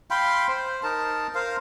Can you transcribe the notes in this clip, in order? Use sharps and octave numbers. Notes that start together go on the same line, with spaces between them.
F5 G5 B5 C6
C5
D#4 A#4 A5
A#4 C5 F5